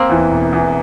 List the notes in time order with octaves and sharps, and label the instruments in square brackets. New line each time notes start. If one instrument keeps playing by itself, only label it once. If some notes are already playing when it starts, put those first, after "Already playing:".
Already playing: [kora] A#3 C4
[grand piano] E2 E3
E1
E2 E3